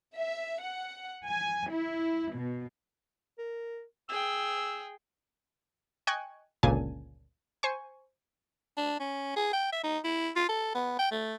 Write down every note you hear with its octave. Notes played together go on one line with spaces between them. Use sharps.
E5
F#5
G#5
E4
B2
A#4
G#4 G5 E6
D#5 G5 G#5 C#6 F#6 G#6
G1 C#2 A#2 C#3 G#5 A5
C5 G#5 C#6
D4
C#4
G#4
G5
E5
D#4
E4
F4
A4
B3
G5
A3